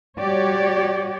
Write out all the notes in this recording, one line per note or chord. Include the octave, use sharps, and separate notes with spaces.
G3 F#4 G4 C#5 D5